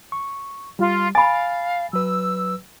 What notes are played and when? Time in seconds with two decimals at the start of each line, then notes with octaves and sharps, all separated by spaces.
0.12 C#6
0.79 G3 F4
1.15 F5 G#5 B5 A6
1.93 F#3 B4 E6